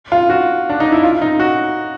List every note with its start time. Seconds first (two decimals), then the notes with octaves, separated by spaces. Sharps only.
0.12 F4
0.30 F#4
0.70 D4
0.80 D#4
0.92 E4
1.03 F4
1.22 D#4
1.40 F#4